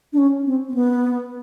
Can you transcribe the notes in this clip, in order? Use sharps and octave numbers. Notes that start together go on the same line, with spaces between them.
D4
C#4
C4
C4
B3